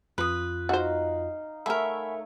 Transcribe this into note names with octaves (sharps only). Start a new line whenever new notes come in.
F2 F4 B4 D#6
D#4 F#4 C5 F5
A3 A#4 C#5 E5 F#5 G#5 B5